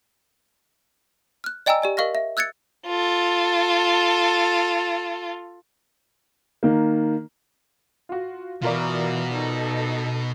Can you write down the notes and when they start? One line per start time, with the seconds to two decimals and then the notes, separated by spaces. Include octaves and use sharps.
1.44 F6 F#6
1.66 D5 D#5 G5 G#5 A#5 E6
1.82 G4 D5 G#5
1.97 A#4 D#5 F5 C#6 F6 A#6
2.15 E5
2.37 E6 F#6 G#6 A6 C#7
2.87 F4 A4
6.63 D#3 A#3
8.09 F4 F#4
8.62 B2 E3 F4 F#4 A#4 D5
9.34 D#4 A4